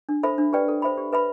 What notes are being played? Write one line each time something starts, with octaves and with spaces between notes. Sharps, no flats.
D4
A4 C5 E5 B5
D4
G4 B4 D5 G5
A4
C5 E5 B5
G4
B4 E5 B5